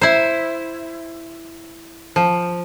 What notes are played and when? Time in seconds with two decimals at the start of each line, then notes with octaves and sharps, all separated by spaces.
0.01 E4 C5
2.16 F3